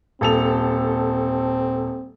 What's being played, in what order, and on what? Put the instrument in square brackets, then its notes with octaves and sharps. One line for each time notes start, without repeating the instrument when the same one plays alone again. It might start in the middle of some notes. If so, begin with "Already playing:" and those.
[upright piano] D#1 A4 F7 [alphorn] C4